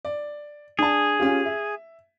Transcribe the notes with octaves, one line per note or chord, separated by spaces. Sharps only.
D5
D4 G#4 A5
C#4 F4 G4
E5